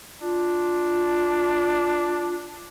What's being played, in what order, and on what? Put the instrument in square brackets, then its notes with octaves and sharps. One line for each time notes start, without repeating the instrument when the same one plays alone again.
[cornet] D4 [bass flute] F4